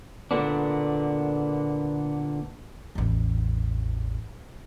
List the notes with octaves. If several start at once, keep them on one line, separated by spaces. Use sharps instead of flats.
A#2 D3 B3 D4
A1 E2